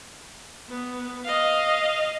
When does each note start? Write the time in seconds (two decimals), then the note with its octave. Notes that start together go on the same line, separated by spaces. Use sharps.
0.69 B3
1.25 D#5 F5